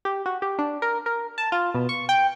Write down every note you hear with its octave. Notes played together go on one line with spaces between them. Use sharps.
G4
F#4
G4
D4
A#4
A#4
A5
F4
B2
C#6
G5